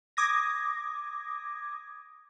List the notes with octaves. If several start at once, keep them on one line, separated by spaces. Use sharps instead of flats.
D6 D#6 G#6 A#6